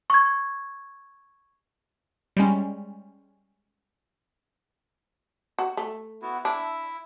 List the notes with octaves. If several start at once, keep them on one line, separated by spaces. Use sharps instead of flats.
C#6 G#6
G3 G#3 C#4
F#4
A3
B3 E4 F#4
D4 E4 E5